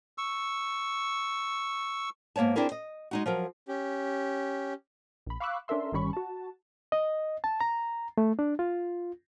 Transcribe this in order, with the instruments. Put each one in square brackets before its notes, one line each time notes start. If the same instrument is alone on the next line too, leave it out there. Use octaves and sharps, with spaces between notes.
[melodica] C#6 E6
[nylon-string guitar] G#2 A#3 B3 C#5 A5
C4 D4 E4 G#4 A#4
D#5
G#3 D#4 F#4
F3 F#3 A#4
[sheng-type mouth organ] C#4 G4
[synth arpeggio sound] A#1 B5
F5 B5 C#6 D6 E6 F#6
C#4 D4 A4 A#4 E5 C6
G1 D#3 G3 C#4 B5 C#6
F#4 A5
[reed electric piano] D#5
A5
A#5
A3
D4
F4